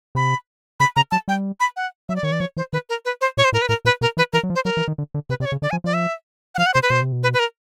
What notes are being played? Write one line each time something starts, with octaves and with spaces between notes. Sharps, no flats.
C3 B5
C#3 B5
C#3 A#5
F#3 A5
G3 G5
B5
F#5
F#3 E5
D5
D#3 C#5
E3 D5
F3 C#5
E3 C5
D#3 B4
A#4
B4
C5
A#2 C#5
C5
A2 A#4
B4
A2 A#4
A#2 B4
B2 A#4
E3 B4
E3 A#4
F#3
F3
C5
F#3 A#4
E3
D#3
D3
D3
C3 B4
C3 D5
C#5
C#3
D3 D5
F3 G#5
F3 D5
E5
F#5
F3 F5
F#5
C3 C5
B4
B2 C5
C3
B2
B4
B4
A#4